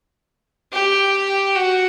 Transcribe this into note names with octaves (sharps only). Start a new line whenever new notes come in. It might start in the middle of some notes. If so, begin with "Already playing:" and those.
G4
F#4